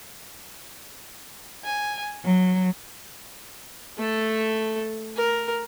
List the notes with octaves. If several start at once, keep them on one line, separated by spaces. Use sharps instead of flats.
G#5
F#3
A3 A4
A#4